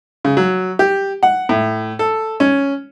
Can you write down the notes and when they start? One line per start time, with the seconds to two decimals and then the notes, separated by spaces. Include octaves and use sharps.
0.25 C#3
0.37 F#3
0.79 G4
1.23 F#5
1.49 A2
1.99 A4
2.40 C#4